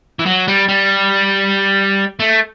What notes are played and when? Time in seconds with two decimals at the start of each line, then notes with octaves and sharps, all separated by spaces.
0.19 E3
0.26 F#3
0.48 G3
0.68 G3
2.19 A3